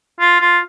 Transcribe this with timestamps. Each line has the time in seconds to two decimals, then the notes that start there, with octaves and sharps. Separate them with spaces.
0.20 F4
0.40 F4